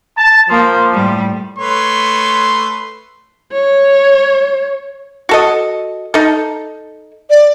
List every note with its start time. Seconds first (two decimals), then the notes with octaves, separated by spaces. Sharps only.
0.17 A5 A6
0.49 F3 A#3 C6
0.93 A2 G3
1.58 A3 B4 C#5 C6
3.53 C#5
5.29 F#4 A4 D#5
6.14 D#4 A4
7.30 D5